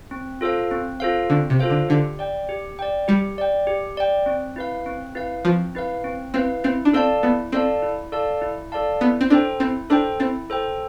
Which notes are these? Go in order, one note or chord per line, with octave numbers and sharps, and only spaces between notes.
C4
F4 A4 C5 F5
C4
F4 A4 C5 F5
D3 C4
C3
F4 A4 C5 F5
D3
D3 G4
D5 G5
G4
D5 G5
G3 G4
D5 G5
G4
D5 G5
C4
E4 B4 F5
C4
E4 B4 F5
F3 C4
E4 B4 F5
C4
C4 E4 B4 F5
C4 E4
D4
C4 A4 D5 F5 A5
B3 E4
C4 A4 D5 F5 A5
E4
A4 D5 F5 A5
E4
A4 D5 F5 A5
B3 E4
C4
D4 A4 C5 G5
C4 E4
D4 A4 C5 G5
C4 E4
A4 C5 G5